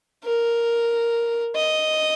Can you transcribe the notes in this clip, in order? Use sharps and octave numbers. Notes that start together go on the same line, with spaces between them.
A#4
D#5